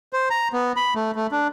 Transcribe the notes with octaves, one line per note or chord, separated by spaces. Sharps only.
C5
A#5
B3
B5
A3
A3
D4